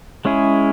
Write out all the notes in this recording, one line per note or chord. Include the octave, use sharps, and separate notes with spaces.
G#3 C#4 E4 G#4